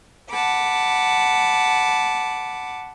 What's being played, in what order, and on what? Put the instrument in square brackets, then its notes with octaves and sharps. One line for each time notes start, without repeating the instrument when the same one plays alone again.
[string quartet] F#5 A5 B5 D6